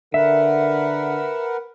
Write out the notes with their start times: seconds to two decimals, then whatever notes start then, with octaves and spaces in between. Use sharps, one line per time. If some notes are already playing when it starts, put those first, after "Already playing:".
0.14 D3 A#4 B4 E5 F#5